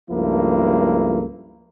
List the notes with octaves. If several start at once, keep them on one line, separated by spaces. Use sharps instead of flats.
C#2 G2 F3 A3 A#3 E4